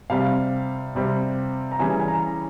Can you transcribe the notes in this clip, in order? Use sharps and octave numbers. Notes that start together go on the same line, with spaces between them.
C3 G3 C4 F5
C3 G3 C4
A#5
C#3 E3 G3 G#5
G#5
A#5